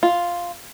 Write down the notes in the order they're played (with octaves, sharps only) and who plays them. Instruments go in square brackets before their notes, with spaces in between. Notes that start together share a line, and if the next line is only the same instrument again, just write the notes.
[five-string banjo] F4